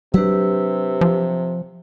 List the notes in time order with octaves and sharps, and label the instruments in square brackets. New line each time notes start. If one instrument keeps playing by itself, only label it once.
[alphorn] C3 [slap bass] F#3 D4 [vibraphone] G4 B4 E6
[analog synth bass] F3